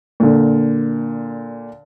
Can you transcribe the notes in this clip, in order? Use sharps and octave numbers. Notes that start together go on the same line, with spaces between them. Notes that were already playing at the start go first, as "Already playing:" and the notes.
A#2 D3